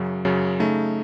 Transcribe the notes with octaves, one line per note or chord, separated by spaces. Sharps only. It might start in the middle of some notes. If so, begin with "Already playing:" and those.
Already playing: F#2 C#3 F#3
F#2 C#3 F#3
C#3 A3 D#4